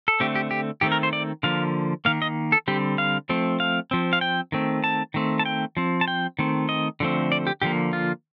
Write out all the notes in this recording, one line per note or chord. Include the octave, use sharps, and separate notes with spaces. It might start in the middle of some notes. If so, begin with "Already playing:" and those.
A4
D3 A3 C4 G4
G4
G4
D#3 A3 C4 G4
A#4
C5
D5
D3 F3 A#3 F5
D#3 A#3 F5
D#5
A4
D3 G3 C4 G4
F5
F3 A3 C4
F5
F3 C4
F5
G5
D#3 A3 C4
A5
D#3 A3 C4
A5
G5
F3 C4
A5
G5
D#3 A3 C4
D#5
D3 F3 A3 C4
D5
G4
D3 F3 A#3 G4
F4